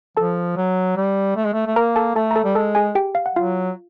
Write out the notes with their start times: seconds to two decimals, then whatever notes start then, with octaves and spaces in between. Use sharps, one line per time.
0.17 F3 A4 A5
0.57 F#3
0.97 G3
1.36 A3
1.45 G#3
1.53 A3
1.66 A3
1.76 A#3 A#4 A#5
1.96 A4 A5
2.15 A3 A4 A5
2.31 A#5
2.36 A4 A5
2.44 G3
2.55 G#3 A4 A5
2.75 G#4 G#5
2.95 G4 G5
3.15 F5
3.26 F#5
3.35 F#3 F4 F5